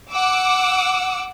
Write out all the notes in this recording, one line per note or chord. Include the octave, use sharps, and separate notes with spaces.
F#5 D6 E6